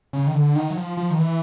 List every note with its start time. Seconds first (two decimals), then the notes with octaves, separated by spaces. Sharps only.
0.13 C#3
0.27 D#3
0.33 D3
0.55 D#3
0.70 F#3
0.76 F3
0.97 F3
1.11 D#3
1.18 E3